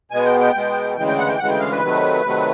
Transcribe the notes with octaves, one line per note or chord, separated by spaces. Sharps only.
B2 G#3 B3 G#5
G5
G5
B2 G#3 B3
D2 C#3 E3 G#3 G5
G5
F#5
G5
D2 C#3 E3 G#3 F#5
G5
F5
B4
C3 D#3 F#3 A3
C3 D#3 F#3 A3